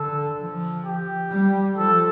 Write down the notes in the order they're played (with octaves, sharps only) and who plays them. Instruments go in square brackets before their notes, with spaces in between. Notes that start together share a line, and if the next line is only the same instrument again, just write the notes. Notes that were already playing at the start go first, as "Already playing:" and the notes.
Already playing: [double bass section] D3 [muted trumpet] A4
[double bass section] F3
[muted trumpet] G4
[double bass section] G3
[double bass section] F3 [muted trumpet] A4